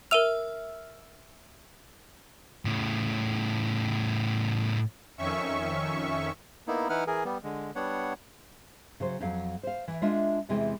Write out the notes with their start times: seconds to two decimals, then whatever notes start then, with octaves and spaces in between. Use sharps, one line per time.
0.11 A#4 E5 E6 F6 D#7 F7
2.65 A2 C#3
5.18 F2 D#3 C#4 E5 C#6
6.68 A#3 B3 D#4 E4
6.90 E3 D#4 E4 B4 F#5 F6
7.07 E3 G#4 A#4
7.25 G3 B3
7.44 D3 G#3
7.75 G3 B3 D4 C#5 F#5
9.00 C#3 F#3 C5
9.20 F2 F#3 F5
9.63 C5 F5
9.88 E3
10.02 G#3 D4 F4 E5
10.49 E2 C3 E3 G#3 G5